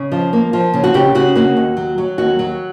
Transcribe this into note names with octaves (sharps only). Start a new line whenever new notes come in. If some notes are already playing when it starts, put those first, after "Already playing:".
Already playing: C#3
F3
A#3
F3
C#3
F#4
C#3 G4
C#3 F#4
A#3 F#4
D#2
F#3
F#3
D#2 F#4
F#3